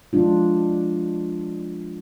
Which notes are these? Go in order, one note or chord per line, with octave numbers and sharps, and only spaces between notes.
F3 G#3 D4 F4